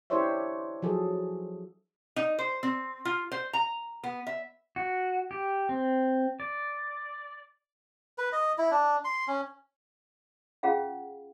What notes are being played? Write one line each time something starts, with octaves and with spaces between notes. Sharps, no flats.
D4 E4 G4 C5 C#5 E5
F3 F#3 G#4 A4
D#4
C5
C4
F4
C5
A#5
B3
E5
F#4
G4
C4
D5
B4
D#5
E4
D4
C6
C#4
C#4 F4 G#4 F5 F#5